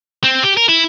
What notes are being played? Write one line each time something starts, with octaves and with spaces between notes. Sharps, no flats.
C4
G4
A#4
E4